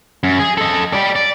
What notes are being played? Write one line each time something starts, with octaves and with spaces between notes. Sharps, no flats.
F#2
G#4
A4 D#5
G3 D5
D5